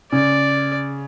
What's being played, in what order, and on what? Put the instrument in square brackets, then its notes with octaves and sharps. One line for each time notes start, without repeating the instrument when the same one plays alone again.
[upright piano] C#3 [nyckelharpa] D5